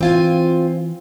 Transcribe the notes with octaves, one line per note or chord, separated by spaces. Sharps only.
E3 C4 F4 G#5